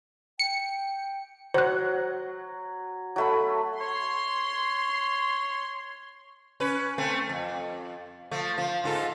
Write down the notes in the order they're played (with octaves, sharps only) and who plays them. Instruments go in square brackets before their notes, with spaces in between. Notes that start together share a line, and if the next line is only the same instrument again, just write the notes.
[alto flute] G5 [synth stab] C#7
[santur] F#3 [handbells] C5 F#6
[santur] F#3 A3 B5
[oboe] C#5 [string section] C6
[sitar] C#4 B4
A3 C4
F2
F3 A3
F3
G#2 F4 A4